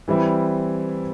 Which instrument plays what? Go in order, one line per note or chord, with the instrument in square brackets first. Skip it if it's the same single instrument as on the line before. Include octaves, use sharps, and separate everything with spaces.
[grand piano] E3 G3 C4 E4